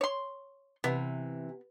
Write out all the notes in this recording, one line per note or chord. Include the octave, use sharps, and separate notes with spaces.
C#5 C6
C3 E3 B3